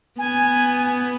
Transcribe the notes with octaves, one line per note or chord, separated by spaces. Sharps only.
B3 G#5